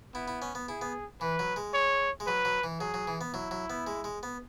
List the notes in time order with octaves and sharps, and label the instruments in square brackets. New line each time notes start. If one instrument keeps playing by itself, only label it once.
[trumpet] B3 [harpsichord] E4
[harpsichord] E4
C#4
B3
[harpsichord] E4 [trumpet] G#4
[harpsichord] B3
[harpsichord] E3 [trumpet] B4
[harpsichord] F#3
G#3
[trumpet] C#5
[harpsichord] G#3
[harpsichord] F#3 [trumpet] B4
[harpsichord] F#3
E3
[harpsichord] F#3 [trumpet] G#4
[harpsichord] F#3
E3
B3
[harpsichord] F#3 [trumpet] E4
[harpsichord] F#3
B3
G#3
G#3
B3